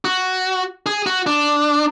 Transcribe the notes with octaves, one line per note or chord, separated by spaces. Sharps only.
F#4
G#4
F#4
D4